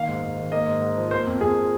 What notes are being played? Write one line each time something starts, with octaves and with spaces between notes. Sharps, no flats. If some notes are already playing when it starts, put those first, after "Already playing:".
Already playing: D#3 A#3 F5
G#2
G#2
D#3
A#3 D#5
G#2
G#2
F3
A#3 C5
F2
F2 G#4
F3